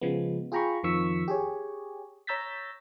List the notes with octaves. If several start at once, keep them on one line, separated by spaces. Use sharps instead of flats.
C#3 F3 G#3 B3
F4 G#4 G5 A#5 B5 C#6
F2 D#3 F3 C#6 E6 B6
G4 G#4 C#5
C#5 A#5 E6 G6 A6 B6